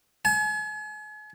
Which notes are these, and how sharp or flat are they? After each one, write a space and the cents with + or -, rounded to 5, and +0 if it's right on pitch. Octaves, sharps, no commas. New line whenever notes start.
G#5 +40